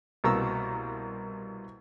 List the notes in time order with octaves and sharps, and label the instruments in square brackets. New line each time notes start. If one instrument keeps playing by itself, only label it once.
[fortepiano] C2 B2 A#3 A#5 C#6 E6